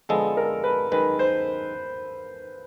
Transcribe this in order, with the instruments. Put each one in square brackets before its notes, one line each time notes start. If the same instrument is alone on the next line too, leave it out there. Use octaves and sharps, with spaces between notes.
[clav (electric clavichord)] F2 D3 F3 G#3 B3 [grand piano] A4
[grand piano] A#4
B4
[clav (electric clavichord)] F#2 D#3 G#3 [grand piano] B4
[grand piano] C5